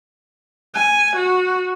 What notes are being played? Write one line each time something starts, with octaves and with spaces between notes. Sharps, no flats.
G#5
F#4